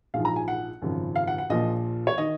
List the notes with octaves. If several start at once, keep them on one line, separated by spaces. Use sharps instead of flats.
A#1 G#2 F3 F5
A#5
G#5
F#5
G#1 F#2 C#3 F3
F5
F#5
F#5
A#1 A#2 F3 D#5
C#5
D#3 D#5